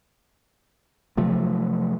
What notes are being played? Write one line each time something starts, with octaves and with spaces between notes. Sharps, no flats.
C3 F3 F#3 A3